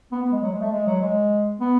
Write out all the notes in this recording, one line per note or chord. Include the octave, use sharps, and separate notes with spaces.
B3
B3
G#3
F#3
G#3
A3
G#3
F#3
G#3
B3